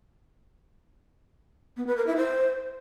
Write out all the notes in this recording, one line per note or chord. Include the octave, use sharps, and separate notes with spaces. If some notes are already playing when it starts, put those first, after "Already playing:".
B3
B4
A#4
E4
C5